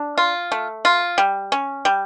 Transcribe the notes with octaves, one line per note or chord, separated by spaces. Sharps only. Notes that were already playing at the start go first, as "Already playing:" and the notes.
Already playing: D4
F4
A3
F4
G3
C#4
G3